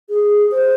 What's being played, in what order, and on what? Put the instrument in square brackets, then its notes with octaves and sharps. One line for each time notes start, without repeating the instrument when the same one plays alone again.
[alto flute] G#4
C5